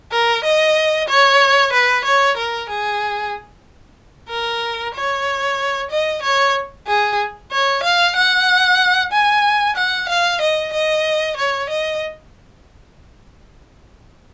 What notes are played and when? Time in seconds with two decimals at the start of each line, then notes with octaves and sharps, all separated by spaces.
0.12 A#4
0.44 D#5
1.09 C#5
1.73 B4
2.05 C#5
2.37 A#4
2.69 G#4
4.30 A#4
4.95 C#5
5.91 D#5
6.22 C#5
6.87 G#4
7.52 C#5
7.83 F5
8.16 F#5
9.12 G#5
9.76 F#5
10.09 F5
10.41 D#5
10.73 D#5
11.37 C#5
11.70 D#5